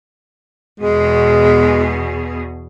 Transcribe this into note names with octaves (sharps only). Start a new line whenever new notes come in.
E2 B2 G#3 G#4